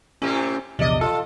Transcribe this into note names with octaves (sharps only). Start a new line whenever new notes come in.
A2 C3 C#4 G4
A#1 E2 C3 D5 D#5
F4 A4